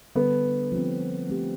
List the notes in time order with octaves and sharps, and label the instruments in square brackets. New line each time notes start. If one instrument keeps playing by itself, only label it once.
[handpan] D3 G3 D4 A4 [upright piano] B3
[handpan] F3 A3 C4
A3 C4 G4